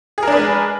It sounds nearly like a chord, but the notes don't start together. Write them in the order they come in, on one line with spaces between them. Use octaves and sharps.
G#4 A#4 D4 B4 G#3